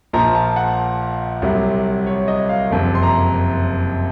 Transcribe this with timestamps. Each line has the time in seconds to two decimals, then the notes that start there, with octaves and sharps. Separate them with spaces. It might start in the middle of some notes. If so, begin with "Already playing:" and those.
0.13 A#1 A#2 F3 A#5
0.35 A5
0.56 F#5
1.42 C2 C3 F#3
2.07 C#5
2.28 D#5
2.49 F5
2.71 F#1 F2 C3
2.95 C6
3.03 A#5